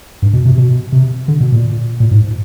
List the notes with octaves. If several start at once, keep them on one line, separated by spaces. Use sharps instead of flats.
G2
B2
C3
B2
C3
D3
B2
A#2
A#2
G#2